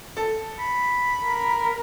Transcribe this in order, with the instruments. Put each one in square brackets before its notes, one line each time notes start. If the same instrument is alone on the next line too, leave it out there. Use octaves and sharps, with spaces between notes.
[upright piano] A4
[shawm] B5
[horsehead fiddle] A#4